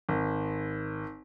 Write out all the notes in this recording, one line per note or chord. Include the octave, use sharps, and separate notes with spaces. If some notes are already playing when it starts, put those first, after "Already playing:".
G#1